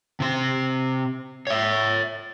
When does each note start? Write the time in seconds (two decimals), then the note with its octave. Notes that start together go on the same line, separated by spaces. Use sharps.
0.20 C3 C5
1.47 C#5 E5